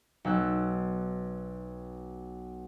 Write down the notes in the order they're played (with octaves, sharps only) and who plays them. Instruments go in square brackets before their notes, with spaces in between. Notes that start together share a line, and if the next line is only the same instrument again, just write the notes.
[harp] B1 E6 F#6